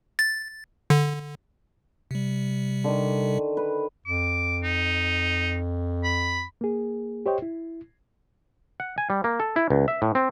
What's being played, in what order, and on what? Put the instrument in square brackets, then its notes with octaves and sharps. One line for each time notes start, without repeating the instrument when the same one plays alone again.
[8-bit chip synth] A6
D3
C3 G3
[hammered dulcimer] D3 D#3
B4
[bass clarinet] F2 [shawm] D6
[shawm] D#4
B5
[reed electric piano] A#3 G#4
G4 C5 C#5 D#5 G5
E4
[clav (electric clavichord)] F#5
G#5
G3
A#3
A4
E4
C#2
E5
A2
C4